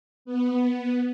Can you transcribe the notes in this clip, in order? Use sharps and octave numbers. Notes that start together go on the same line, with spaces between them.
B3